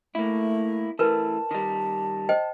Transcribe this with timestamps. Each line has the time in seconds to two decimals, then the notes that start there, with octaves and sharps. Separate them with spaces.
0.15 A3 A#3 E4
0.99 E3 A3 A#4 B4 A5
1.51 D#3 G3
2.29 C5 D#5 G5